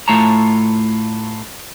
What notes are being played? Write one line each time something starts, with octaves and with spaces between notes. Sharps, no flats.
A2 A3 F4 C#5 A5 A#5